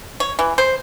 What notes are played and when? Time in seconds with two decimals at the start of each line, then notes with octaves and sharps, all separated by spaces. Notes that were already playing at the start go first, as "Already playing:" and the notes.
0.20 C#5
0.39 E3
0.58 C5